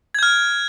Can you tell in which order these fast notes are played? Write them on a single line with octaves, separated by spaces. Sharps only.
G#6 G6 F6